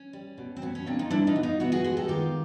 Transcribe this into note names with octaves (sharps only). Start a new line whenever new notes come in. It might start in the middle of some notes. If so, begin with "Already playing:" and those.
Already playing: C#4
G3
B2
C4
B2 C#4
C#4
A#3 C4 D4
D#4 F4
G3 D4 E4
D#4 F4
B2
D#4 F4
B3 E4 F#4
F#4 G#4
G#3 F#4 G#4
G4 A4
D#3 F4 G4